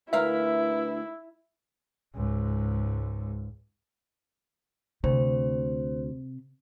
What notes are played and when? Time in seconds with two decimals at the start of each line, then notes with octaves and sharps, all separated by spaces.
0.13 D2 E4 A#4 B4 E5 F5
2.15 C#2 G#2
5.04 D2 C3 C5